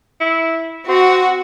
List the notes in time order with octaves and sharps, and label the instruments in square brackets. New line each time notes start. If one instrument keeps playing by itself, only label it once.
[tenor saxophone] E4
[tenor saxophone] C4 [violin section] F#4